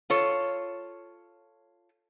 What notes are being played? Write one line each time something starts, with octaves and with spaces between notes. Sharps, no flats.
F4 A4 C#5